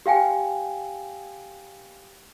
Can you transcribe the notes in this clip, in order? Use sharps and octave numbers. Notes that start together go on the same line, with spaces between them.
G4 F5 G5 G#5